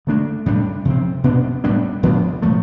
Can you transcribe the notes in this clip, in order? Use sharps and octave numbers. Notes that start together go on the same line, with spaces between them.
D3 A3 D4
A2 G3 D4
C3 F3 C4
B2 B3 D4
A2 G3 B3 D4
A2 F3 B3 D4
A2 F3 A3